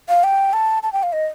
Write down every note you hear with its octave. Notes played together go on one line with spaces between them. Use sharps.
F5
G5
A5
A5
G5
F5
D#5